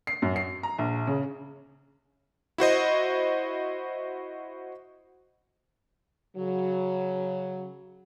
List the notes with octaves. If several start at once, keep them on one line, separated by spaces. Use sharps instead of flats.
C7
F#2
C7
A#5
A#1
C#3
E4 F#4 C5 D#5
C#3 F#3